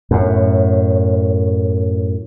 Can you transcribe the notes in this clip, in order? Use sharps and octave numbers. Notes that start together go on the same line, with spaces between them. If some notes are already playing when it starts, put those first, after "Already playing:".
F#2 A2